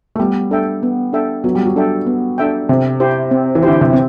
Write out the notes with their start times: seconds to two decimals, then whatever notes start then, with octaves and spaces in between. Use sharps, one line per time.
0.15 A3
0.19 G3 B3
0.51 D4 A4 E5 G5
0.83 B3
1.13 D4 A4 E5 G5
1.44 F#3 B3
1.55 G3
1.66 F#3
1.76 D4 A4 E5 G5
2.07 B3
2.38 D4 A4 E5 G5
2.69 C3 C4
3.00 E4 G4 C5
3.31 C4
3.55 E3
3.63 D3 E4 G4 C5
3.81 C3
3.93 C4